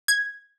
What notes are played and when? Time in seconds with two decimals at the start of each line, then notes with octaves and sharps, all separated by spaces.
0.08 G#6